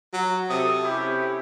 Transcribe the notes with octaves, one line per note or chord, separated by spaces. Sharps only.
F#3
C3 A4 D#6
C#4 E4 G4